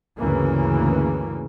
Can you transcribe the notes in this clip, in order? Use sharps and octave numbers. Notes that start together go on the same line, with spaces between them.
D2 G2 C#3 E3 A#3